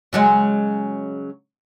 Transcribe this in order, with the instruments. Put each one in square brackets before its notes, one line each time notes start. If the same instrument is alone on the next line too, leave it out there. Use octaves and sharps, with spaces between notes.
[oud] C#3 F#3 G#3